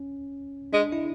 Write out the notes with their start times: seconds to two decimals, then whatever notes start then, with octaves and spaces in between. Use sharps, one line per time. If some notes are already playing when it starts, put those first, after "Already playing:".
Already playing: C#4
0.73 G#3 D4
0.92 E4